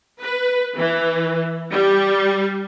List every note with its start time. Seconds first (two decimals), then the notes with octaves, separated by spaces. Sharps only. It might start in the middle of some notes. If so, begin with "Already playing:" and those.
0.20 B4
0.77 E3
1.73 G3